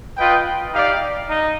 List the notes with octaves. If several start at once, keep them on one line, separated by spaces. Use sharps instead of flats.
F4 B4 D#5 G5
D#4 G4 D5 F5
D#4